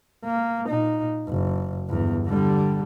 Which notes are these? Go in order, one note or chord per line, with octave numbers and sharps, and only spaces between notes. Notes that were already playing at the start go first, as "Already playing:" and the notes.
A#3
A#2 D#4
F#1
G1 E2
D3 G3